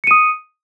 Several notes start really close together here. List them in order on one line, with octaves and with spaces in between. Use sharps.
C#7 D#7 D#6